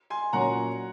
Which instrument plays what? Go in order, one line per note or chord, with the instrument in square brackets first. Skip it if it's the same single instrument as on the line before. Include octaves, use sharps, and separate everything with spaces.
[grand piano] G#5 C6
[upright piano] A#2 F#3 C#4 F#4 [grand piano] F#5 A#5